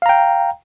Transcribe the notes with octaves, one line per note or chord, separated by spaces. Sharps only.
F5 G5 A#5